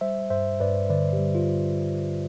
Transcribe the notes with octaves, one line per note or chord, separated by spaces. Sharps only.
G3 C5 E5
G2 C5 E5
G2 B4 D5
D3 B4 D5
G4
G3
F4